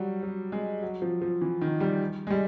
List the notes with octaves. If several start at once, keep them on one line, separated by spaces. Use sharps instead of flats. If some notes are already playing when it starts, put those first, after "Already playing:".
Already playing: F#3 G3
F#3
G#3
F#3
F3
F3
E3
D#3
G3
G#3
G3